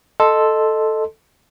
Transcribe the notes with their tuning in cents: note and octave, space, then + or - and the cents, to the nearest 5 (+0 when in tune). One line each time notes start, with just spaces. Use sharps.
A4 +0 D#5 -5 C6 +0